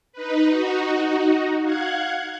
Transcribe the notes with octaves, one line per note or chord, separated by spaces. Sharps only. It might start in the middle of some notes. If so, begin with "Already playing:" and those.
D#4 B4
D#4 F#4
F5 F#5 F#6 G#6